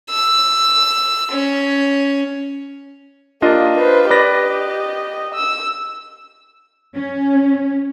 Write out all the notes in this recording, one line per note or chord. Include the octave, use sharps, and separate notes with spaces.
E6
C#4
A#3 D4 F4 G4 D#5
B4 C5
G4 B4 D5 D#5 A#6
E6
C#4